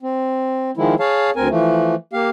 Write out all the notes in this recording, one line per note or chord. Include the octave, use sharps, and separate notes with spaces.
C4
D#3 F3 G#3 E4
G#4 C#5 F5 A5
D2 C4 A#4 G#5
E3 F3 A3
A#3 G4 F5